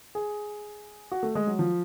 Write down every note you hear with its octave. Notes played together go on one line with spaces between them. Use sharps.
G#4
F#4
A3
G#3
F#3
F3